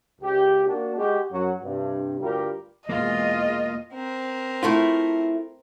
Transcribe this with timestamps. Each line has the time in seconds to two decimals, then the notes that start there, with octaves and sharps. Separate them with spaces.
0.21 C#2 G4
0.67 A#3 D4 F#4
0.97 G#3 F#4 G4
1.30 F#2 F#3 F#4
1.63 G2 C3
2.20 D2 G2 G3 F4 G4 A#4
2.89 E2 B2 G#3 A#3 F4 D#5
3.94 C4 A#4
4.63 A3 E4 F4